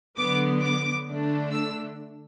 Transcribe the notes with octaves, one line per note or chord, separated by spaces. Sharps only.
D3 F#3 B3 D6
D6
D3 A3 D4
E6